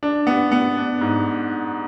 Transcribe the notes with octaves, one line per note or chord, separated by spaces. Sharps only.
D4
B3
B3
D4
G#2